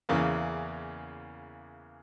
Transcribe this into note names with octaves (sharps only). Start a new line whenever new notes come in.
E2 C#3 E3 A#3